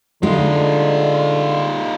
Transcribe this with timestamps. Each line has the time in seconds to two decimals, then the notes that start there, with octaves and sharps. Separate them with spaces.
0.23 D3 G#3 D#4 F4